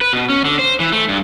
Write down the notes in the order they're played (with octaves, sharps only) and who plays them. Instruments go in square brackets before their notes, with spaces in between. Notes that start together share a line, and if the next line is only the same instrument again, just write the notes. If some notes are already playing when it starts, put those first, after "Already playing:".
[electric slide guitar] B4
B2
C#4
D3
C5
E3
A3
G2